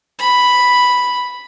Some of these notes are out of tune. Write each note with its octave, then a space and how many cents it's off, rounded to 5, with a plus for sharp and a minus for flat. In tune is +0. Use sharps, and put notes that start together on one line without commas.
B5 +0